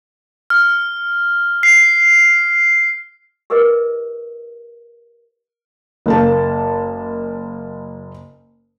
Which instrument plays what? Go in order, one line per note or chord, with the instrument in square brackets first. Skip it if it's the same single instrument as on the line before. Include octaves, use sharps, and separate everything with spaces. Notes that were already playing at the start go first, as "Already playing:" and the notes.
[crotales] F6
C7
[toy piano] G4 G#4 A#4 B4 D#5
[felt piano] F#1 A#3 A5